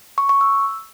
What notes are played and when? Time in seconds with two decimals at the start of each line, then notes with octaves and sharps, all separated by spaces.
0.18 C#6
0.29 C#6
0.41 E6